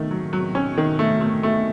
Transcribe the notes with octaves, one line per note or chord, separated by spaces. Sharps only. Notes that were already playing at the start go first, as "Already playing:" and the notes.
Already playing: D#3 A3
F#3
F#3
C#4
D#3
A3
A3
A3